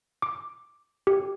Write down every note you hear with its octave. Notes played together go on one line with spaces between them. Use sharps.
D6
G4